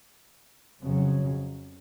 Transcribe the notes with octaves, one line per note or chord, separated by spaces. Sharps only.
F2 C#3 F#3